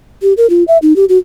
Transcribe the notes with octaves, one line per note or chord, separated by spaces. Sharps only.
G4
A#4
F4
E5
D#4
G4
F#4